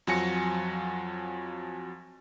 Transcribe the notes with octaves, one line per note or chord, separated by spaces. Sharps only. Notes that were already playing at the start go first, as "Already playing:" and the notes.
F2 F3 F#3 G#5 A#6 C#7